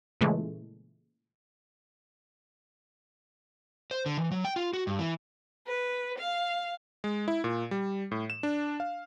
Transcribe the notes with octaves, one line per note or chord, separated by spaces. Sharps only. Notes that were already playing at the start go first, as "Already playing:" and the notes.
A#2 C#3 E3 G#3 A3
C5
D3
E3
F#3
G5
F4
F#4
G2
E3
B4
F5
G#3
E4
A#2
G3
A2
E7
D4
F5